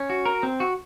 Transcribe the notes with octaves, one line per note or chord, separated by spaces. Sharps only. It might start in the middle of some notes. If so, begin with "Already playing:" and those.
Already playing: C#4
F#4
A#4
C4
F#4